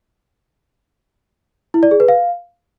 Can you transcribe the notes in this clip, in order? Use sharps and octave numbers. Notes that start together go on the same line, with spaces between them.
E4
D5
G#4
B4
F5